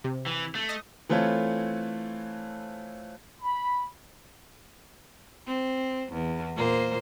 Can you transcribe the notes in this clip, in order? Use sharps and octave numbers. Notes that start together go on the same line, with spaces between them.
C3
E3
A3
D#5
E3 A3 C4 F4 A4 C#5
B5
C4
E2
A#2 A#3 C5